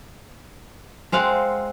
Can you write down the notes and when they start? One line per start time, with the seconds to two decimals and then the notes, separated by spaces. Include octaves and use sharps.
1.12 G#3 C4 F5 F#5